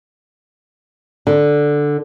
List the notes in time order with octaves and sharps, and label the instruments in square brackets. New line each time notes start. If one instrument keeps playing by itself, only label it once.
[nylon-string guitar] D3